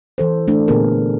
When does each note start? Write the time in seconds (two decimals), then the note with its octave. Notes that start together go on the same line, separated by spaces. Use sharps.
0.18 E3 A4 C5
0.48 A3 D4
0.68 A#2 D3 B3 F4 G#4 A#4